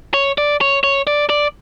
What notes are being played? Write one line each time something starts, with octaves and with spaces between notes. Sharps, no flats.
C#5
D5
C#5
C#5
D5
D5